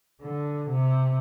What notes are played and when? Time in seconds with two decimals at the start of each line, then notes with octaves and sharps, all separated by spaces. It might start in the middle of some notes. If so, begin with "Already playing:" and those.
0.22 D3
0.69 C3